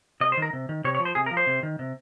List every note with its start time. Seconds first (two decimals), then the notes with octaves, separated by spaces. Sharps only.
0.20 C3 D#5
0.32 C5
0.37 D#3 A#4
0.53 C3
0.69 D#3
0.84 C3 C#5
0.95 C#5
0.99 F3
1.05 C5
1.15 C3 G#4
1.26 A#4
1.31 F3
1.37 C5
1.47 C3
1.63 D#3
1.79 C3